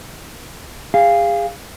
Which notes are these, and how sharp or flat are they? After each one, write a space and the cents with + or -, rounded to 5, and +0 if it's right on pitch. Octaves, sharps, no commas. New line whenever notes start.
G#4 -30 F5 -10